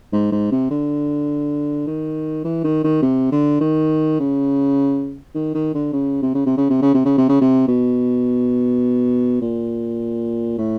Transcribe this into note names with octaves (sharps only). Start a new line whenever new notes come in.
G#2
G#2
C3
D3
D#3
E3
D#3
D#3
C3
D3
D#3
C#3
D#3
D#3
D3
C#3
C3
C#3
C3
C#3
C3
C#3
C3
C#3
C3
C#3
C3
B2
A#2
A2